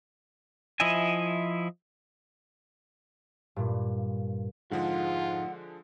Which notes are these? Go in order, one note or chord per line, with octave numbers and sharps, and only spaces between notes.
F3 E4 D#5 E5 G#5
G2 A#2
F2 G#2 D3 F3 G#3 F4 F#5